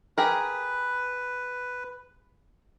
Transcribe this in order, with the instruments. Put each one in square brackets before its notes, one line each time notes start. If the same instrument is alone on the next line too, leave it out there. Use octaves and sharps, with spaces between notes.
[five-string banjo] G4 G#4 A#4 [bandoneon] B4